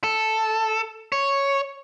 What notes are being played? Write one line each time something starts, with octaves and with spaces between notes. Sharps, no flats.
A4
C#5